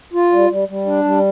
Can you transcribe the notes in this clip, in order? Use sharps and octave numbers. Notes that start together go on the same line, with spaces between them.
F4
G3
G3
G3
D4
G3